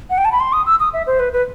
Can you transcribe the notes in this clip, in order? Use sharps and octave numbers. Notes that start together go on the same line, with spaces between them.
F#5
G5
A5
B5
C6
D#6
E6
D#6
E5
C5
B4
B4